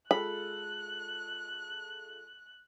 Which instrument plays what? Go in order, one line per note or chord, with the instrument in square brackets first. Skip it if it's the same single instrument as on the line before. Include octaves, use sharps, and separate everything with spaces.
[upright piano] G#3 F4 A4 [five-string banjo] B5 [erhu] F#6